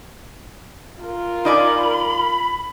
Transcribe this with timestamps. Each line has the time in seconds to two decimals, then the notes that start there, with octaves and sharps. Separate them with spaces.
1.02 F4 A#4
1.45 D#4 D5 G#5 B5